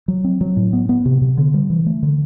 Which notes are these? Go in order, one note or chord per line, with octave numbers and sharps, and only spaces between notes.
F#3
C4
F#3
A2
B3
B3
C3
C3
D3
G3
E3
A3
D3